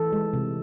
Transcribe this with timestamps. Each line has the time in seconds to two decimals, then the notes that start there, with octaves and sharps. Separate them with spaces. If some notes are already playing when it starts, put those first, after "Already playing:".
Already playing: E3 A4
0.13 G#3
0.33 C3